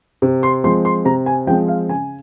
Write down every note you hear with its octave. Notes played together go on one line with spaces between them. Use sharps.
C3
C6
F3 G#3 C4 C6
C6
C3 A#5
G#5
F3 G#3 C4 G5
F5
C#3 G#5